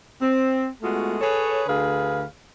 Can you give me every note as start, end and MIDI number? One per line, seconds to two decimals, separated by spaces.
0.22 0.67 60
0.82 1.17 56
0.82 1.17 57
0.82 1.17 59
0.82 1.17 65
0.82 1.17 66
1.21 1.63 68
1.21 1.63 69
1.21 1.63 71
1.21 1.63 73
1.69 2.24 38
1.69 2.24 50
1.69 2.24 68
1.69 2.24 71
1.69 2.24 77